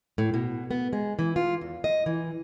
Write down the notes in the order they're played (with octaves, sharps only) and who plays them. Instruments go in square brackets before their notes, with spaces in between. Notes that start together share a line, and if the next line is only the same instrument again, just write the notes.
[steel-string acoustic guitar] A2
B2
B3
G#3
E3
F4
E2
D#5
E3